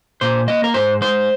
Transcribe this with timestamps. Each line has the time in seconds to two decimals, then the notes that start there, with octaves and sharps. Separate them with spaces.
0.21 A#2 C5
0.48 A#3 D#5
0.64 A#4
0.74 G#2 C5
1.01 G#3 C5